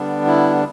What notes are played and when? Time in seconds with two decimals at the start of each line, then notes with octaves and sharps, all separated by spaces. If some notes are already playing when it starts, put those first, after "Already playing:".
Already playing: D3 G3 B3 D4
0.26 E4